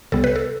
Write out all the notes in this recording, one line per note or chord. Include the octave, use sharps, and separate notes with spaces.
C2 C3 G3 B3 A4
B4
A4